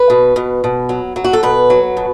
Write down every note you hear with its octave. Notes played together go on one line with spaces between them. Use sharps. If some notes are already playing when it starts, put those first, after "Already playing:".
Already playing: B4
B2
B2
B2
F#3
F#3
F#4
A4
B2 B4
F#3
B2